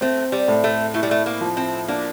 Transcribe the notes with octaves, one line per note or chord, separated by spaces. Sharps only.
A3 C4
G3
A2
A3
A3 E4
G3
A3
A#3
F3
C4
A#3 D4